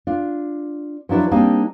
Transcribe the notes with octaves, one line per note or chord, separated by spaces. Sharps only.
D4 F4
F3 F#3 D4 E4 B4
G3 A#3 C4 D4 D#4